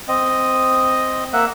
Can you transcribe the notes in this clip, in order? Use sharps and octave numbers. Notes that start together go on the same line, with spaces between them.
C4 D#5
A#3 E5 F#5